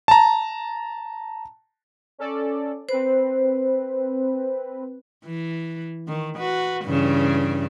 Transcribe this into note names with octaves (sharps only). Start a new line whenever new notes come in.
A5 A#5
C#4 A4 D5
C4 B4 C5
E3
D#3
F#4 B4
G2 C#3 E3